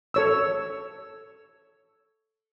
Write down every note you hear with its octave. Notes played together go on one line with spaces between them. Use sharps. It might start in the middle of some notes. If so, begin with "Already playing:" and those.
A4 C#5 E6